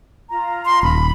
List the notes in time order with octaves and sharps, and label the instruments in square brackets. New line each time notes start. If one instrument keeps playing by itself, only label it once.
[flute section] F4 A#5
[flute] C6
[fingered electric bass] D#1 [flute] B5